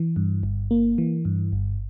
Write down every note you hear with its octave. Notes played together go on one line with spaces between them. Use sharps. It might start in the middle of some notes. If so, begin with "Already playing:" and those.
Already playing: E3
G2
G1
A#3
E3
G2
G1